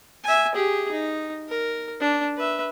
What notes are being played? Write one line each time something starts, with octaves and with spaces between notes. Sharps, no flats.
E5 G#5
G4 G#4
D#4
A#4
D4
B4 E5